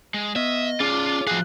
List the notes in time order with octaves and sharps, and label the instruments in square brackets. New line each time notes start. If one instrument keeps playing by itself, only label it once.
[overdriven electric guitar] G#3
[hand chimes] B3 [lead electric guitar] D#5 [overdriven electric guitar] E5
[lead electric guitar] C#4 D5 [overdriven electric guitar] F4 [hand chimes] G#4 D6
[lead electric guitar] F3 G#4 [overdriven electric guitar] F#4 F5 [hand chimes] F#6